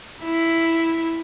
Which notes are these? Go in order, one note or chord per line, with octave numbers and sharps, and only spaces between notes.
E4